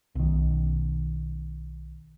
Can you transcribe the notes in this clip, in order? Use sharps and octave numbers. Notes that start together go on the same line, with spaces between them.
B1 D#3